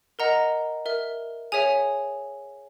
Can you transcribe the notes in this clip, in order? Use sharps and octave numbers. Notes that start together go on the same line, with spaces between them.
A#4 D#5 F#5 A#5
A#4 E5
G#4 C#5 E5 G#5